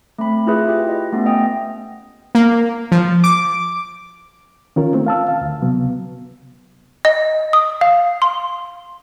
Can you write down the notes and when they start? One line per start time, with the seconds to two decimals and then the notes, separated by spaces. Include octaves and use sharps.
0.19 A3 C4 B5
0.47 E4 F4 G#4 B4 E5
0.68 F4 G4 B4
0.89 D#5
1.12 A3 B3 C#4
1.26 D#5 G5 D#6
2.35 A#3
2.92 F3
3.24 D6
4.76 D#3 C#4 F4 A#4
4.94 A3 C4
5.06 F5 A5 E6
5.29 F5
5.41 D2
5.62 C3 F#3 B3
7.05 D#5
7.53 D#6
7.81 F5
8.22 C6